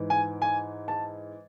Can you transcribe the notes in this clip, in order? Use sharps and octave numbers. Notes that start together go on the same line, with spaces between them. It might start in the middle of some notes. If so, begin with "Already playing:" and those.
Already playing: G#2 E3
G#5
G#5
A5